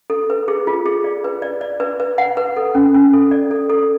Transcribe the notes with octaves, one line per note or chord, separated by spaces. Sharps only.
A4
B4
G#4
F4
G#4
D5
B4
D5
D5
B4
B4
F#5
B4
A4
C#4
C#4
A4
D5
A4
A4